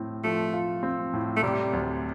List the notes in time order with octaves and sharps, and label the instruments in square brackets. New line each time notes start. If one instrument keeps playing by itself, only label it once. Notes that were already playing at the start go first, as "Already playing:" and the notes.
Already playing: [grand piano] A2 C4
[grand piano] F3 [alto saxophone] A3
[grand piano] F4
C4
A2
[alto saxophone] A3
[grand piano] C3 [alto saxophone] G3
[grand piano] D2